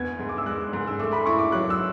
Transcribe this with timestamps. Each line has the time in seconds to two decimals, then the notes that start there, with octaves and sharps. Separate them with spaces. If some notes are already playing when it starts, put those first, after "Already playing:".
Already playing: E2 B3 G#6
0.19 G#2
0.29 D6
0.38 E6
0.46 G#3 F#6
0.73 G#2
0.87 E6
0.99 A3 D6
1.13 B5
1.26 E4 C#6
1.39 D6
1.52 F#3 F#6
1.70 E6